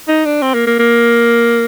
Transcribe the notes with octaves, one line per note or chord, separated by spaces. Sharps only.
D#4
D4
C4
A#3
A#3
A#3